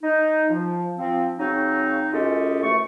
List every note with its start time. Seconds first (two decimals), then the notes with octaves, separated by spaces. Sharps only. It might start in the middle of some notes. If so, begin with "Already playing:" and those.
0.02 D#4
0.50 F3
0.98 F3 C4
1.39 C#3 F#3 C4 D#4
2.13 F#2 G#3 C#4 F4 G4 A4
2.62 F#2 E3 A3 C#6